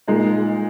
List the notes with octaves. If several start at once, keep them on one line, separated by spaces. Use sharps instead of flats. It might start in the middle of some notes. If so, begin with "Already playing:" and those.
A#2 G#3 D#4